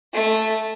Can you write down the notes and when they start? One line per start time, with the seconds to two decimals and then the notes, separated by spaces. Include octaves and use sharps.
0.13 A3